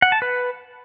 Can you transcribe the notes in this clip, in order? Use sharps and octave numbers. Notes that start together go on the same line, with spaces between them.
F#5
A5
B4